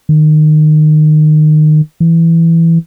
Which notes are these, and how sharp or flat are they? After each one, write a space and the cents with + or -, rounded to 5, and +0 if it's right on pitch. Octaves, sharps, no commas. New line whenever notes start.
D#3 -25
E3 +5